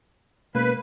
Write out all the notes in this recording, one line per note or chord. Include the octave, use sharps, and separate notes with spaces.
B2 G#3 A#3 C#4 B4